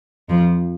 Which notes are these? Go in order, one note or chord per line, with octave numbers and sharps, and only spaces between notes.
F2 F3